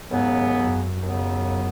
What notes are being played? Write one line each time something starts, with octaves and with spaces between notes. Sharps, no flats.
D#2 G#2 C#3 F#3 B3
F#2
D#2 C#3 F#3 B3